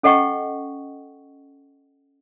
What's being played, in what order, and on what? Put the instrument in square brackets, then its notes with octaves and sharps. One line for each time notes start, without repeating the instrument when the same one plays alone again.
[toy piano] C#4 A4 D#5 F#5 G5 C#6